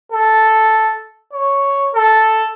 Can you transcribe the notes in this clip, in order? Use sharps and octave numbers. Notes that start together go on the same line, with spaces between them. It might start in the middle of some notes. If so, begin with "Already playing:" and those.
A4
C#5
A4